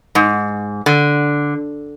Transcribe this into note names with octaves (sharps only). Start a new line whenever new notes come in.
G#2
D3